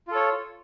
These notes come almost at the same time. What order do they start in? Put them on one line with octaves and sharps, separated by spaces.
F4 A4 C#5